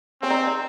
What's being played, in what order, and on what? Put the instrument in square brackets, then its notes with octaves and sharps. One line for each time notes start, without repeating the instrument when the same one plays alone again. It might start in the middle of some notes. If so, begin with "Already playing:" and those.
[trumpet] C4 [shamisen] C#4
[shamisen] D#4
D#4